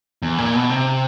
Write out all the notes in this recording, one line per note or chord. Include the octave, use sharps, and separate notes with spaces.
E2
A#2
B2
C3